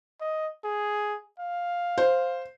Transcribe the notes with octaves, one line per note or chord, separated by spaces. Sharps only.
D#5
G#4
F5
C5